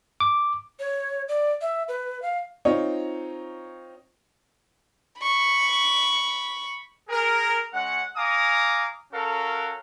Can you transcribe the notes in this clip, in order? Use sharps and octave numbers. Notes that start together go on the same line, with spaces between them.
D6
C#5
D5
E5
B4
F5
C4 D#4 F4 C#5
B5 C#6
G#4 A#4
G#3 C#4 F#5
F5 G#5 A#5 D6 D#6
C#4 F#4 A4 A#4 F5